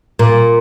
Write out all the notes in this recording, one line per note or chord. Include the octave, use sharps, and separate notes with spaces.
A#2